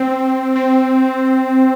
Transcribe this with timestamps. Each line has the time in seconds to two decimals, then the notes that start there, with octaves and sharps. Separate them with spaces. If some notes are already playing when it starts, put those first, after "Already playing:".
Already playing: C4
0.56 C4